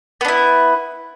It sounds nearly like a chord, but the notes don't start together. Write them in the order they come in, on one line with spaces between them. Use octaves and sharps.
B3 D4 E4